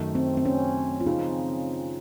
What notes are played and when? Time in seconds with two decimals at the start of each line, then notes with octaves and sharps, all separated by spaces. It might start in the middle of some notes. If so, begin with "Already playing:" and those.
Already playing: F#2 D#3 A3 D#4
0.15 C4
0.37 C4
0.45 C#4
1.01 F4
1.06 C#3 F3 C4 D#4